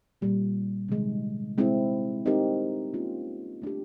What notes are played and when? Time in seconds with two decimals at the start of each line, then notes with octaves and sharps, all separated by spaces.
0.21 A#2 G3 A#3
0.88 C3 D#3 G#3
1.58 G#3 C4 E4
2.26 C4 D#4 G4 A#4
2.93 A#3 C#4 F4
3.62 A3 D4 G4